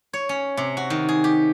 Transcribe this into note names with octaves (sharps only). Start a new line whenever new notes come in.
C#5
C#4
C3
F#4
D#3
G#4
G4